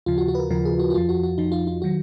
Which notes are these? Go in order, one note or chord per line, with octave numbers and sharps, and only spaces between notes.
D#2 C#3 F3 F4
F#4
F#4
B4
A#4
D#2 C#3 F3 A#4
G#4
F#4
F#4
F2 F3 F4
F#4
F#4
F2 F3 D#4
F4
F4
D#3 F#3 F#4